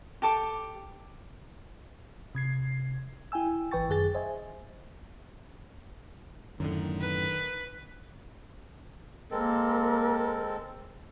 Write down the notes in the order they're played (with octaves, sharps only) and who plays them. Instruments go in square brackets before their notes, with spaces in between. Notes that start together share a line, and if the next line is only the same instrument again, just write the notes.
[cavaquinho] G4 A4 D6
[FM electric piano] C3 G#6 C7
E4 G5 G#5 E6
G#1 E3 B4 G5 C#6 A6
F#2 D#3 G#4 A6
C5 D#5 E5 G#5
[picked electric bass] F#2 A2 D3 [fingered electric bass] D#3
[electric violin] B4
[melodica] G#3 C4 A4 [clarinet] A#3 [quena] A#4